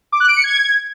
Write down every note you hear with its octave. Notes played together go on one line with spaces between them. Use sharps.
D6
F#6
D7
C#7
G#6